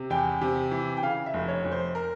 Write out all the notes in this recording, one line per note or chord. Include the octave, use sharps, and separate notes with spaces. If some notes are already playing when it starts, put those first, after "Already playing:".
Already playing: C3
E2 G5
C3
E3
G5
C#3 F5
E5
F1
C#5
F1
C5
A#4